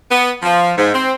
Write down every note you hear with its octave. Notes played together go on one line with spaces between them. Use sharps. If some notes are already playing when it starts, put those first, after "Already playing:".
B3
F3
G#2
C4